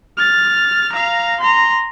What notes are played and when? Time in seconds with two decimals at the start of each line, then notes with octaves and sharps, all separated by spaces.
0.17 F6 A6
0.92 F5 A#5
1.41 A#5 C6